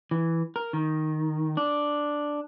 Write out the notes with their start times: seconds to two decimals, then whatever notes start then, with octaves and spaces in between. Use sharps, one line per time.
0.11 E3
0.56 A#4
0.73 D#3
1.57 D4